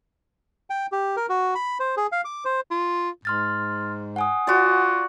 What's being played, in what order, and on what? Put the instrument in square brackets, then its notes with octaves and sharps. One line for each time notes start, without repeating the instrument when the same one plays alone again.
[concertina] G5
G4
A#4
F#4
B5
C5
G#4
F5
D6
C5
[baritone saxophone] F4
[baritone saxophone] G#2 [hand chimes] C6 F6 A6
[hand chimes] F#5 G#5 D#6
[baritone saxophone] F4 [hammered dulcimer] F#4 D5